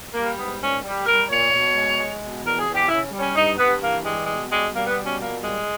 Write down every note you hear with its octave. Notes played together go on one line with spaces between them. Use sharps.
G3 A#3
G#2 B3
A#2 C#4
G3
G3 A#4
A#2 C#5
B2
G#3
G#3
B2
E2 A#4
G#4
E2
G4
C#3 E4
G3
C#4
G2 D#4
G2 B3
E3 A#3
G3 G#3
B2 G#3
G3 G#3
G3 A#3
B3
B2
C#4
A#2 A#3
G3 G#3